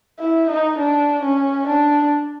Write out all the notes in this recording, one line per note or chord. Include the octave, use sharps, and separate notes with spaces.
E4
D#4
D4
C#4
D4